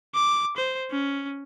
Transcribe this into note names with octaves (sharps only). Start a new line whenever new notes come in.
D6
C5
C#4